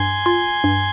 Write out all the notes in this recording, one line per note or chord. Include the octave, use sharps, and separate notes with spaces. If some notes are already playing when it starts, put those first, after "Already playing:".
Already playing: G2 G#5 C6
F4
G2